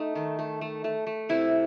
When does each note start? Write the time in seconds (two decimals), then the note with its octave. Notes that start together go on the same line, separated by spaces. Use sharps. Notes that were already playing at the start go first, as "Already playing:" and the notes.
Already playing: A3 D#4
0.15 D#3
0.39 A3
0.61 A3
0.84 A3
1.07 A3
1.29 C3 E4